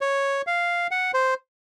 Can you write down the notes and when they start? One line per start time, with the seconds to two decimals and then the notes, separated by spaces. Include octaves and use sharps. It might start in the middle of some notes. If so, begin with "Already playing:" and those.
0.01 C#5
0.47 F5
0.91 F#5
1.14 C5